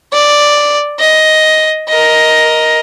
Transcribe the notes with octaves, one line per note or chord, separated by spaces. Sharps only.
D5
D#5
A#4 D#5